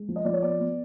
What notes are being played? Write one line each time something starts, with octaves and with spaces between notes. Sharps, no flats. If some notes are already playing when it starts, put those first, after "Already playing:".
Already playing: G#3
F3
D#5
F3 D5
C#5
B3 D5
B3